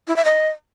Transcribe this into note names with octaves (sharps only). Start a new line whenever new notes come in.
E4
E5
D#5